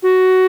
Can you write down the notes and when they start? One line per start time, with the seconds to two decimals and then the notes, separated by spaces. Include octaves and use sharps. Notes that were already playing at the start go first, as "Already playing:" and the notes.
0.03 F#4